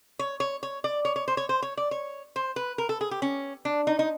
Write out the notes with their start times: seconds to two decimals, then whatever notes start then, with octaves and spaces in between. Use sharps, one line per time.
0.19 C#5
0.40 C#5
0.63 C#5
0.84 D5
1.05 C#5
1.16 C#5
1.28 C5
1.37 C#5
1.49 C5
1.62 C#5
1.77 D5
1.91 C#5
2.36 C5
2.56 B4
2.78 A#4
2.89 A4
3.01 G#4
3.11 G4
3.22 C#4
3.65 D4
3.87 D#4
3.99 D#4